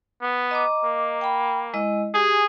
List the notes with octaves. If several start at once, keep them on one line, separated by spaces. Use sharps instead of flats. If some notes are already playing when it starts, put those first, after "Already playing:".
B3
D#5 A#5 D6
A#3
G5 B5
G#3 E4 D#5
G4 G#4 G#5 D#6